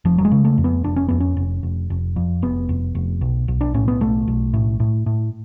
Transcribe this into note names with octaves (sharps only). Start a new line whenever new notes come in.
F1 F3
F#3
G#3
C#3
A3
F2
B3
F1 D4
C#4
F2 B3
C#4
F1
F1
F1
F2
F1 B3
F1
F1
B1
B1
D4
A2 C#4
B3
B1 A3
B1
A2
A2
A2